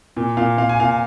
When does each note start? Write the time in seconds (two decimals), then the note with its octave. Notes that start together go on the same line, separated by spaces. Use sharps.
0.17 A#2
0.37 A#2 F5
0.58 A#2 F5
0.69 G#5
0.80 A#2 F5